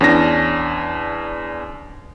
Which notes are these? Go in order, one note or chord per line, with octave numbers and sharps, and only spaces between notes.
E2 C#4 D4 A#6